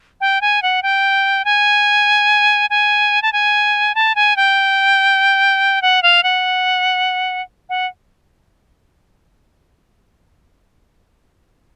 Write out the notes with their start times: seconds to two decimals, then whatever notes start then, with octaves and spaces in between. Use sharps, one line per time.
0.21 G5
0.41 G#5
0.62 F#5
0.83 G5
1.45 G#5
2.70 G#5
3.22 A5
3.33 G#5
3.95 A5
4.15 G#5
4.37 G5
5.82 F#5
6.03 F5
6.23 F#5
7.69 F#5